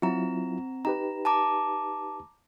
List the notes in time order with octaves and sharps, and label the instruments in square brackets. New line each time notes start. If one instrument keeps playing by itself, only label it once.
[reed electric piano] F#3 E4 F4 [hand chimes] C4 A#5
[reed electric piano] D#4 G4 B4 [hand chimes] A#5
[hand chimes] A5 A#5 D6